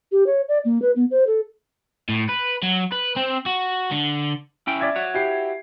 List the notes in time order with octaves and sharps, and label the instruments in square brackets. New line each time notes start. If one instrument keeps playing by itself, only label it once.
[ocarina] G4
C#5
D5
A#3
B4
B3
C5
A4
[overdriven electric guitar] A2
B4
F#3
B4
C4
F#4
D3
[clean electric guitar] C#4 E4 G5
[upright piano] D5 E5 G#6
[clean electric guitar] F#4 C#5
[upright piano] E4 G4 C7